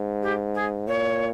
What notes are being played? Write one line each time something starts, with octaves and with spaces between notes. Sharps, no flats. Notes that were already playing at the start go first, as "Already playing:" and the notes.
Already playing: G#2
G4
G#4
A#2 C#5